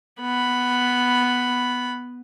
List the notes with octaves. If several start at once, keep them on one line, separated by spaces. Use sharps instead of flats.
B3 B5